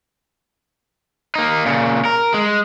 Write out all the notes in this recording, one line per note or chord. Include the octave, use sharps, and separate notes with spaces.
A#3 D#4
A#2 C#3
A#4
G#3